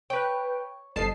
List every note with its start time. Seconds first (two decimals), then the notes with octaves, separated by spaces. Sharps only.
0.10 B4 C#5 G5
0.96 G1 F3 D#4 A4 A5 C7